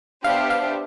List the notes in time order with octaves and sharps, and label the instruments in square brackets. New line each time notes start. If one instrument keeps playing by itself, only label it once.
[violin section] B3 D4 G4 C5 E5 [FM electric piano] F5
[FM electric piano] F5